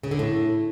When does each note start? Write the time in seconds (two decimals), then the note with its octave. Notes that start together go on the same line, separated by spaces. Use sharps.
0.03 C#3
0.11 D3
0.19 A2